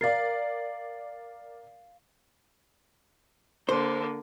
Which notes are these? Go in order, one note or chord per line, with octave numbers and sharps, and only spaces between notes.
A#4 D5 F5 A6 C7
D3 A#3 C5